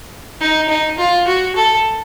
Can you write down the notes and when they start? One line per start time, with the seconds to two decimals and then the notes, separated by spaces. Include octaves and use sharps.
0.40 D#4
0.69 D#4
0.98 F4
1.27 F#4
1.56 A4